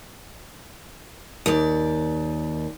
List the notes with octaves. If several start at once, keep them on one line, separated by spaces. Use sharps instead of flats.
D#2 D5